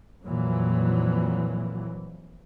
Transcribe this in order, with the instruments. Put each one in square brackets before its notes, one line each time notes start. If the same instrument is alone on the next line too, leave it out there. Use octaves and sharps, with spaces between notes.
[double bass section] F2 A#2 E3 F#3